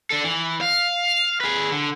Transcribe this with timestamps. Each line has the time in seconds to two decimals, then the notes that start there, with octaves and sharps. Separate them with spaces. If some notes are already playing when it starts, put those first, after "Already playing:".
0.10 D4 A4
0.24 E3
0.61 F5
1.40 G#4 B4
1.72 D3